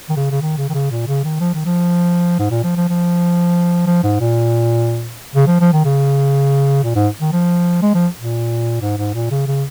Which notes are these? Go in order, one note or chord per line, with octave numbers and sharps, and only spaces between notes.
D#3
C#3
C#3
D#3
C#3
D#3
C#3
A#2
C#3
D#3
F3
D#3
F3
G#2
A#2
F3
F3
F3
F3
G#2
A#2
C#3
F3
F3
D#3
C#3
A#2
G#2
D#3
F3
G#3
F3
A#2
G#2
G#2
A#2
C#3
C#3